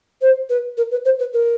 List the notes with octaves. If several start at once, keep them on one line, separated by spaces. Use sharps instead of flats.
C5
B4
A#4
B4
C5
B4
A#4